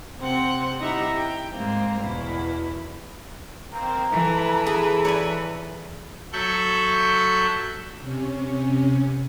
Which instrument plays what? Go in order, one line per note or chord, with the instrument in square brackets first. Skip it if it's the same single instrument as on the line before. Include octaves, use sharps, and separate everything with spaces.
[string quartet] C3 C4 F#5
D#4 E4 G4 E5 F#5 A#5
G5
G#2 G#3 A#3 C4
E2 B2 E4
[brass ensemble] D#3 A#3 C4 [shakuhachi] A#5
[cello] E3 [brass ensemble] A4 B4
[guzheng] G#4
C#5 D5 G#5
[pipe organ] F#3 A4 E5 C#6 F#6 G6
[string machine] C3 C#4